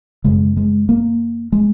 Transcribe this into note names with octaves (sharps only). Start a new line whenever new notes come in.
F#2 C#3 G#3
G#3
A#3
G#3